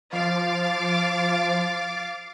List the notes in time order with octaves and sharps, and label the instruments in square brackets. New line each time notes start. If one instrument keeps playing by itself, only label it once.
[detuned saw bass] F3 [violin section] F5 D6 A6